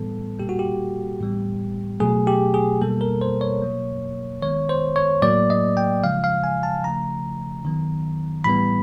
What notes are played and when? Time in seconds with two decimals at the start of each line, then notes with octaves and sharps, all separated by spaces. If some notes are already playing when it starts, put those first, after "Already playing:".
Already playing: A2 E3 G3 B3 A4
0.39 A#2 G3 A#3 G4
0.49 F#4
0.59 G4
1.20 A2 E3 G3 B3
2.00 B2 F#3 A3 G#4
2.27 G4
2.54 G#4
2.81 B2 G3 A#3 A4
3.01 A#4
3.21 C5
3.41 C#5
3.62 B2 F#3 A#3
4.42 D#3 G#3 B3 C#5
4.69 C5
4.96 C#5
5.22 A2 F#3 A#3 D5
5.50 D#5
5.77 G5
6.04 C#3 F3 G#3 F5
6.24 F5
6.44 G#5
6.63 A5
6.83 C#3 F3 A3 A#5
7.65 D#3 F#3 B3
8.44 A2 E3 G3 B3 B5